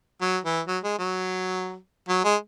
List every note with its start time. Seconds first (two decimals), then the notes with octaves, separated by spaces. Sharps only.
0.21 F#3
0.44 E3
0.67 F#3
0.84 G#3
0.99 F#3
2.09 F#3
2.24 G#3